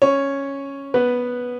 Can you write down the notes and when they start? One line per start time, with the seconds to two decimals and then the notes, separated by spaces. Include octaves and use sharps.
0.02 C#4 C#5
0.94 B3 B4